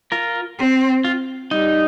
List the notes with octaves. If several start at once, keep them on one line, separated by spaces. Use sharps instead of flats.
F4 A#4
C4
F4
G3 D#4